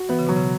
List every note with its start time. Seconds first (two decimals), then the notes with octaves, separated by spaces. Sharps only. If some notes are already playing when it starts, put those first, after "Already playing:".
Already playing: F#4
0.09 E3 B3
0.19 C#3
0.27 B2 F#3
0.36 C#3